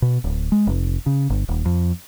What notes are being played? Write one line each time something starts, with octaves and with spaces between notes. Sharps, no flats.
B2
D1
G#3
F1
C#3
G1
D#1
F2